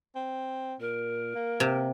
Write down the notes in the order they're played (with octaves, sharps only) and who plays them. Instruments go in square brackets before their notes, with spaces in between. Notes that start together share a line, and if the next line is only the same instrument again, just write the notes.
[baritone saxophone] C4
[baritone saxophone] A#2 [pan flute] A#4
[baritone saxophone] A#3
[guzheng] C3